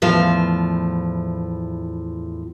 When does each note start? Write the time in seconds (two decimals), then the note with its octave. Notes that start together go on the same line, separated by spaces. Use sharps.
0.02 E2 A2 F3 F5